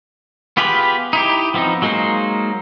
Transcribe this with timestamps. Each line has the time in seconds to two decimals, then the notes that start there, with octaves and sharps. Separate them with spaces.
0.57 B3 F4 G4 G#4 B4
1.13 D#4 E4 G4
1.54 F3 B3 C4 D#4
1.82 F#3 G#3 A#3 D#4 C5